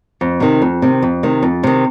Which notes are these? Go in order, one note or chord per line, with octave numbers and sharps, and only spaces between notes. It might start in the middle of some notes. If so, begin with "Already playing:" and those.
F2
C3 D#3
F2
C3 D#3
F2
C3 D#3
F2
C3 D#3